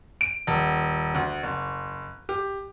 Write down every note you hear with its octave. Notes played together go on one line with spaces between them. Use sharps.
D7
D#1
D2
F#1
G4